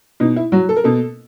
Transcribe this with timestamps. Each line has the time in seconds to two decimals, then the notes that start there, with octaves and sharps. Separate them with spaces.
0.20 B2 D#4
0.36 E4
0.52 F#3 F#4
0.69 A4
0.76 A#4
0.84 B2 A4